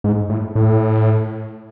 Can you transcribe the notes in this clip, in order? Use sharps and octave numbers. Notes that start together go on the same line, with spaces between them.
G#2
A2
A2